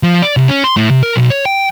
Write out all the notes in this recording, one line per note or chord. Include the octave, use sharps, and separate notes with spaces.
F3
D5
C2
C#4
C6
A2
C3
A#4
B1
C#5
G5